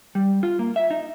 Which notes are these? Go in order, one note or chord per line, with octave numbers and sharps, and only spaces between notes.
G3
F4
A#3
E5
D#4